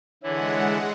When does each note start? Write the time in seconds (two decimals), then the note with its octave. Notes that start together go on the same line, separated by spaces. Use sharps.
0.23 D3 E3 G#3 E4 C#5 F#5